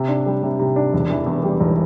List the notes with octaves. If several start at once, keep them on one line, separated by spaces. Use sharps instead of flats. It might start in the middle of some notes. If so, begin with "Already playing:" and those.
Already playing: C3
D4
G3
C3
C3
D4
E1
E3
E2
G3
E1